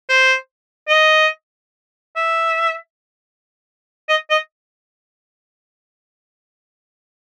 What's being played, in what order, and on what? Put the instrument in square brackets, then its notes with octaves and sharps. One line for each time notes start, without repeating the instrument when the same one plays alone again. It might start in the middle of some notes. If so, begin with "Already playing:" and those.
[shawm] C5
D#5
E5
D#5
D#5